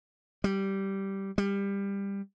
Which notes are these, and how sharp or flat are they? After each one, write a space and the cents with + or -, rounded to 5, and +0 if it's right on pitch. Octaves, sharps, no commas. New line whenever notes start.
G3 -10
G3 +20